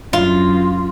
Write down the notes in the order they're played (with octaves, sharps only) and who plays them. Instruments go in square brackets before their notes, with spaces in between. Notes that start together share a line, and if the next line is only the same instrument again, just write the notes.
[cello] F#2 [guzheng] F4